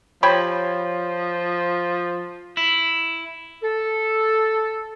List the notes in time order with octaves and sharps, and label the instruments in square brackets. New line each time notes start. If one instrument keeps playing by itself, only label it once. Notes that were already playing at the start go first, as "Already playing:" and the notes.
[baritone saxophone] F3 [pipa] G4 C#5 B5
[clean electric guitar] E4
[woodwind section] A4